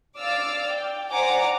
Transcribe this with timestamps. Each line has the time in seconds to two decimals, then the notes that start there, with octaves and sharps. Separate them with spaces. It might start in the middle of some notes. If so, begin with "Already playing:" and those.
0.18 D5 F5 D6 E6 F6 A6
0.68 G5
1.11 C5 D5 F#5 G#5 A#5 D6